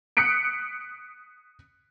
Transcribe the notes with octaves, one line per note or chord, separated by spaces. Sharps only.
D#6 F#6 B6 C#7 D7